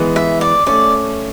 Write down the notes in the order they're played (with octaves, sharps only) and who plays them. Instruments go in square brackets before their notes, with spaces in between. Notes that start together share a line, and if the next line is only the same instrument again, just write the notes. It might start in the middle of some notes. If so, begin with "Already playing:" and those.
Already playing: [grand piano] E3 G#3 B3
[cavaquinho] E5
D5
[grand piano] A3 C#4 [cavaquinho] D5